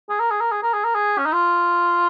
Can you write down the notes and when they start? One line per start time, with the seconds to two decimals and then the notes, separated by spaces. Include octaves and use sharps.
0.09 G#4
0.20 A#4
0.31 G#4
0.41 A#4
0.52 G#4
0.63 A#4
0.74 G#4
0.84 A#4
0.95 G#4
1.18 C#4
1.25 D#4
1.33 F4